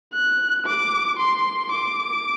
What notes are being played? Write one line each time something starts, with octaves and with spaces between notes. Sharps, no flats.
F#6
D6
C6
D6